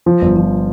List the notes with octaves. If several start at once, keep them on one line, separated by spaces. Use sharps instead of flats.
F3
G1
F3